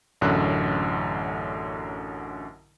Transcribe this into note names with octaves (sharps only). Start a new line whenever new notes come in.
A1 F#2 D3 F#6